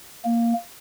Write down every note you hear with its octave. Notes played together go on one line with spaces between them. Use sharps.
A#3